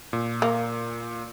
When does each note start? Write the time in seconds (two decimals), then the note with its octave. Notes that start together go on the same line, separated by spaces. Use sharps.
0.13 A#2
0.42 A#3